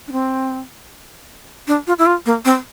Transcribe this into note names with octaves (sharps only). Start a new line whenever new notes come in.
D4
C4
D4
F4
E4
F4
A#3
C4